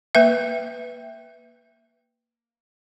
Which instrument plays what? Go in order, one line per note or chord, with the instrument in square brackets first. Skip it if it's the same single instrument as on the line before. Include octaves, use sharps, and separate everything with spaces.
[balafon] A#3 B4 E5